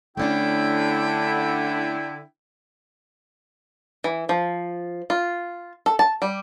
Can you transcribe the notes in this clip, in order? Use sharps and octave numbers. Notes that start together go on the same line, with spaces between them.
D3 A3 C#4 D4 E4 G5
E3
F3
F4
A4
A5
G3